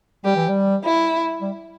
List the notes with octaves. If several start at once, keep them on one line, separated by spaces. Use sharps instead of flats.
G3 G4
E3
G3
E4
G3